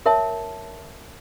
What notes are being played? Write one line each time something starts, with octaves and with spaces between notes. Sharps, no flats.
A#4 C#5 E5 A5